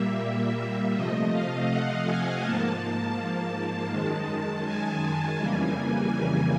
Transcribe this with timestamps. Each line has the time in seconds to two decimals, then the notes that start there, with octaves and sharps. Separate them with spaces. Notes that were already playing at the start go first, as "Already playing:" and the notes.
Already playing: A#2 G3 A#3 E5
0.95 C3 F3 A3 D#5
1.33 F5
1.70 F#5
2.06 G#5
2.43 G#2 F3 A#3 A5
3.17 A5
3.91 F#2 D#3 G#3
4.64 G#5
5.38 F2 C#3 E3 G3 A#3
6.11 G#5